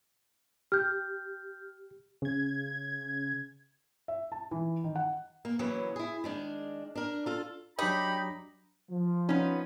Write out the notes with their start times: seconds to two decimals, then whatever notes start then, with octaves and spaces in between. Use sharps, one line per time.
0.72 G4 F6 G6
2.22 C#3 G#6
4.08 E5
4.32 A5
4.51 E3
4.84 D#3
4.96 F#5
5.45 A#3
5.59 C#3 E3 F#3 A#3 B3 C#4
5.96 E4 G#4
6.24 D#3 G#3 D4
6.95 D4 A#4
7.26 F4 A4
7.79 F#3 D4 D#4 G4 B5
8.90 F3
9.29 B3 C#4 D#4